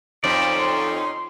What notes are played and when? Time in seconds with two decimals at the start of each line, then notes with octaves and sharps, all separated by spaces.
0.24 F2 D#3 C#4 D#4 C5 D5
0.58 C6